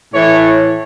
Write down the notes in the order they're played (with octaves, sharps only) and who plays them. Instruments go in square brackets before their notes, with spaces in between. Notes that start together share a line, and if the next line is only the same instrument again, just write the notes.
[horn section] A2 E3 C#5